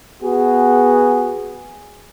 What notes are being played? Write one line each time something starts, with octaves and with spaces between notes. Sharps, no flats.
B3 F#4 G#4